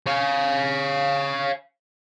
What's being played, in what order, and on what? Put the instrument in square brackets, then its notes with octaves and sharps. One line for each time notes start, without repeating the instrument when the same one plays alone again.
[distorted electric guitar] C#5 F5